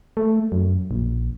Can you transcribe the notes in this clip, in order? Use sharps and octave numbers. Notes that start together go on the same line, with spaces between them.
A3
F#2
A#1